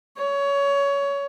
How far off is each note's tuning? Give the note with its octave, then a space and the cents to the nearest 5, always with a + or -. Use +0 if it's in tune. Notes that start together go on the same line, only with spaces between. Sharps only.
C#5 +20